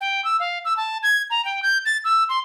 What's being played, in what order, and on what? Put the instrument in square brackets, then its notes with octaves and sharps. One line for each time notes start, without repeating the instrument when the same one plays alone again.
[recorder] G5
E6
F5
E6
A5
G#6
A#5
G5
G6
A6
E6
C6